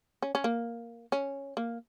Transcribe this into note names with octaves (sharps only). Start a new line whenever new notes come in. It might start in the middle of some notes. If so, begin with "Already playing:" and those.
C#4
C#4
A#3
C#4
A#3